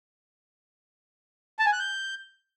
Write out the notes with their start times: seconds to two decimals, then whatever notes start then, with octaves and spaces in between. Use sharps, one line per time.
1.59 A5
1.66 G#5
1.73 F#6
1.79 G6